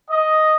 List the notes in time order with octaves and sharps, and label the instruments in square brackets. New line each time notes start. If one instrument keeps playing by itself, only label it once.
[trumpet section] D#5